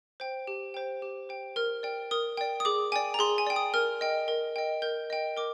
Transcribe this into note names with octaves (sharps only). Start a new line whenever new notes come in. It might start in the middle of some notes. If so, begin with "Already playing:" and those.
C5 G5
G4
C5 G5
G4
C5 G5
A#4 F6
D5 G5
A#4 D#6
D5 G5
D#6
G#4 D6
D5 G5 G#5
A#5
G#4 C6
G#5
D5 G5
D#6
A#4 F6
D#5 G5
A#4
D#5 G5
A#4 G6
D#5 G5
A#4 D6